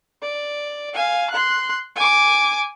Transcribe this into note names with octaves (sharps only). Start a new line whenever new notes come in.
D5
F5 G#5
C6 F#6
G#5 D6